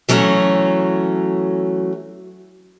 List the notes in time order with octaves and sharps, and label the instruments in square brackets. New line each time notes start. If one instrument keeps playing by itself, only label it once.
[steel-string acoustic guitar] E3 F#3 A3 C#4